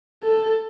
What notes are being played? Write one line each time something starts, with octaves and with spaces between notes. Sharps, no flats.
A4